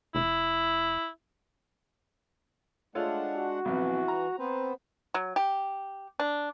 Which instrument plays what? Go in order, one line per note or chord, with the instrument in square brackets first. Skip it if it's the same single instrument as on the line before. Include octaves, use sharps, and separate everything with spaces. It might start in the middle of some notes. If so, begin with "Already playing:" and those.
[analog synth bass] F1 [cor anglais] E4
[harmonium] G#3 D4 F#5 [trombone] A3 [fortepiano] F4 A4 C#5
[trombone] F#4
[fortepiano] B1 F2 [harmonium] E3
[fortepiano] A#5
[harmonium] B3 B4 C5 [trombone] C4
[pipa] F#3
G4
D4